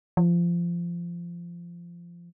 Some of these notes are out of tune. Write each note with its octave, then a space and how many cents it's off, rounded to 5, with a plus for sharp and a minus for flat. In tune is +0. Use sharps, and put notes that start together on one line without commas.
F3 -20